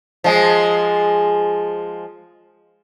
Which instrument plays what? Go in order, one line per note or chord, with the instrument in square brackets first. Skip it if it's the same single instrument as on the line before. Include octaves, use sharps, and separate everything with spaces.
[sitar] F3 G#3